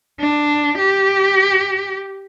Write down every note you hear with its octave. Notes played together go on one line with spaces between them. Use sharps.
D4
G4